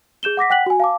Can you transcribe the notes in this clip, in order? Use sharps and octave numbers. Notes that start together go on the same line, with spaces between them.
G#4 G6 E7 G7
F#5 D6 A#6 B6
F#5 G5 F#6 B6 F#7
F#4 G#5
F5 A5 D6